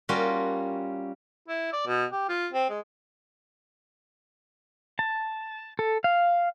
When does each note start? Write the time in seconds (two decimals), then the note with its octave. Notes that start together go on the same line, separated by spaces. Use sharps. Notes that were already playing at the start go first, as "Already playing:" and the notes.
0.09 G3 A#3 C#4 F4 F#4
1.48 E4
1.72 D5
1.87 B2
2.12 G4
2.28 F4
2.53 C4
2.69 G#3
4.99 A5
5.79 A4
6.04 F5